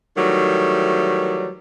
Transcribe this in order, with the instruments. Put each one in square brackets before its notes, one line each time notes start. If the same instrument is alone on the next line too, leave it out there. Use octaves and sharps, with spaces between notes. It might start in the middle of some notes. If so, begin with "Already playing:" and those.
[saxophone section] D#3 E3 F#3 G3 A3